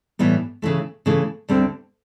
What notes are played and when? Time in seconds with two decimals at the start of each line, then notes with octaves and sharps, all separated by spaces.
0.19 A2 E3 G3 B3
0.62 C#3 E3 A3
1.06 C#3 E3 A3
1.48 D2 D3 G3 C4